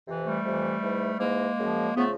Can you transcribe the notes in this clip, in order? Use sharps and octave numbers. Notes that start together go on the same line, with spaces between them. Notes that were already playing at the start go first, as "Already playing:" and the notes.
F2 C3 E3
G3 A3
F2 C3 E3
G#2 E3
G#2 E3 G#3 A#3
F#2 C#3 F3
C#3 F3 A3 B3